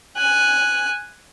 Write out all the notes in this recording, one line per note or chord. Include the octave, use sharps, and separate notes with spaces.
G#5 F#6